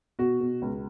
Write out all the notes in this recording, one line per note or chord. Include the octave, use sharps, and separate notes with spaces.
B2 F#4
B2
C#2